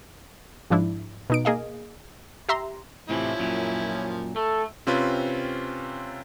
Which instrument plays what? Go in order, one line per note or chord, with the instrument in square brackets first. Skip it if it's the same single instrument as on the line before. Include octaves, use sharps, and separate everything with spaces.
[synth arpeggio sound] G#2 F3 D4 E4
B2 D#4 D7
A#3 G#4 D#5 F5
G4 E5 A#5 C6
[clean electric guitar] A2 C3 E3 [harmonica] F3 C#4 E4
[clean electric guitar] F#2 A#2
[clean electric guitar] A3 [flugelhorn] A4
[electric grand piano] C3 C4 C#4 F4 B4